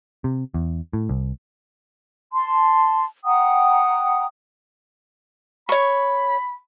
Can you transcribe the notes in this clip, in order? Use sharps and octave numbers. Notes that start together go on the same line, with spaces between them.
C3
E2
A2
C2
A5 C6
F#5 G5 A#5 D#6
C#5 B5 C#6